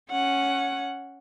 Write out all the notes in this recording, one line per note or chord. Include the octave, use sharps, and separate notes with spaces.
C#4 F#5